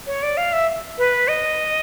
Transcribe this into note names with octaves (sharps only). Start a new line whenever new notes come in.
C#5
D5
F5
E5
B4
D#5